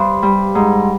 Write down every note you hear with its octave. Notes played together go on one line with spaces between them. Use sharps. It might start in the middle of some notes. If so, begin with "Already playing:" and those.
Already playing: G2 C5
G3
G#2